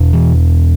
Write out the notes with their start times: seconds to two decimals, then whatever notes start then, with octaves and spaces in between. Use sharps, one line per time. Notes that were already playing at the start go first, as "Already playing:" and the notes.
Already playing: E2 B2
0.13 E3